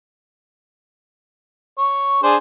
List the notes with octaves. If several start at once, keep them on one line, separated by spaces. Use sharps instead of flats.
C#5
D4 G#4 C5